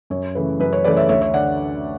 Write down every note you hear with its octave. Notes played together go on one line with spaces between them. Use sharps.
F#2 C#5
C#3 E3 A3 B4
F#2 B4
C#5
C#3 E3 A3 B4 D5
C#5 E5
D2 C#5 E5
C#5 E5
D3 D5 F#5